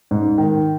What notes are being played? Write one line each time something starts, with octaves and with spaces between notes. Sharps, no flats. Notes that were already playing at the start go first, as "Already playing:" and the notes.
G#2
D#3